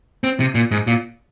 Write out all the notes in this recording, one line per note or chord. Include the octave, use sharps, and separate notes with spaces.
C4
C3
A#2
G#2
A#2